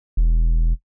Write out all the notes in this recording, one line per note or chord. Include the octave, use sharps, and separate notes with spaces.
E1